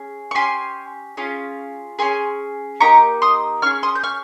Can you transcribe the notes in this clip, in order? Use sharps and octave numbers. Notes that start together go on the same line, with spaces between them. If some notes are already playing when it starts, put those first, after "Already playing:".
Already playing: C#4 G#4
C#6
C#4 G4 G#5 C6
C#4 F4 G#4
C#4 G#4 G#5 C6
A#3 D#4 G4 A#5 C#6
C6 D#6
C#4 G#4 C#6 F6
C6 D#6
G6
C#6 F6